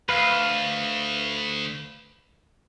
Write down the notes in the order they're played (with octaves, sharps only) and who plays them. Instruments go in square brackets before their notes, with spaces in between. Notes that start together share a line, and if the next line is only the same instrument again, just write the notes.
[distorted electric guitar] D2 [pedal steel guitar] B4 F5